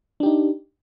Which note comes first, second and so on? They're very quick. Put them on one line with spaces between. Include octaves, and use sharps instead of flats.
D4 G4 D#4